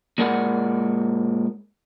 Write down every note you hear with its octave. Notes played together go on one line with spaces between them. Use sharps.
A#2 G#3 A#4 D5 F#5